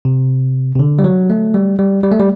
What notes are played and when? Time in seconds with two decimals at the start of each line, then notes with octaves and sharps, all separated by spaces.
0.05 C3
0.75 C3
0.79 D3
0.99 G3
1.04 F#3
1.30 A3
1.54 G3
1.79 G3
2.03 G3
2.12 A3
2.20 G3